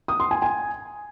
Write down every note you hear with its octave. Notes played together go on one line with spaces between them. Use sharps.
D#6
C6
G#5
G#5